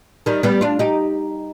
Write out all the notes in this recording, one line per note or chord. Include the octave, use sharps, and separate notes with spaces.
D#3 G3
G3 B3
D4 F4
D#4 G4